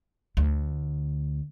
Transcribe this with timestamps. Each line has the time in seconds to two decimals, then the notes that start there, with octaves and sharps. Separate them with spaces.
0.37 D2